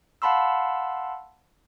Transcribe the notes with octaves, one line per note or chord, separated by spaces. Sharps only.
F5 F#5 A5 B5 C6 E6